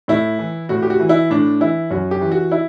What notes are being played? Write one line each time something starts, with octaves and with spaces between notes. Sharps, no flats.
A2 E4
E3
A2 F#4
G4
F#4
E3
E4
A2 D4
E3 E4
F#2 F#4
G4
E3
F#4
E4